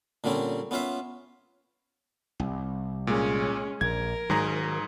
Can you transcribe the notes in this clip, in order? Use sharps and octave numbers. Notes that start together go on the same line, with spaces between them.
A#2 D3 G3 C4 C#4
B3 C#4 F4 E5 F5
C2
A#2 G#3 C#4
A#1 A#4 G#6
G#2 D#3 F#3 G#4 A#5